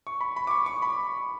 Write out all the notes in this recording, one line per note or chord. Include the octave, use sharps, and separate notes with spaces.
C#6
B5
B5
D6
C#6
C#6
B5